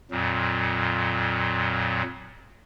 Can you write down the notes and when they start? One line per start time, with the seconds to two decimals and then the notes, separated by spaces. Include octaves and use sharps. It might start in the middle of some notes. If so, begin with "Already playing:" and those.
0.11 F2 A#2 F#3